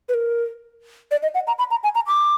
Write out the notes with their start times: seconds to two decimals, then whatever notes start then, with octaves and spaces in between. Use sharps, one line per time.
0.09 B4
0.14 A#4
1.11 D5
1.23 D#5
1.35 F#5
1.47 A#5
1.59 B5
1.71 A#5
1.84 G#5
1.95 A#5
2.08 D6